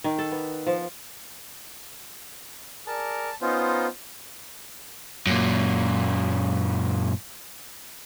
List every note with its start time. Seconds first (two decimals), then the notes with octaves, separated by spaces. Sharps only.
0.04 D#3
0.19 A4
0.32 B3
0.67 F3
2.87 G#4 A#4 D5 A5
3.41 B3 C#4 D#4 F4 C5
5.26 F#2 A#2